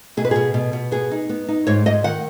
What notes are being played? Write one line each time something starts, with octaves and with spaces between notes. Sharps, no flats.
B2 G#4
B4
B2 G#4
B2
B2
B3 G#4
D#4
B3
D#4
G#2 C#5
G#2 D#5
D#3 F#5